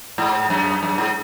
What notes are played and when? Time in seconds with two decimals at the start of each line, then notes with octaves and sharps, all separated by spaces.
0.18 G#2
0.50 F#2
0.83 F#2
0.98 G#2